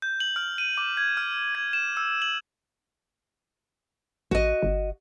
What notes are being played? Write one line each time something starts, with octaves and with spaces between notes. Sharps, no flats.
G6
F#7
F6
D#7
D6
G#6
F6
G#6
E7
E6
F#7
A1 F#4 D#5
G1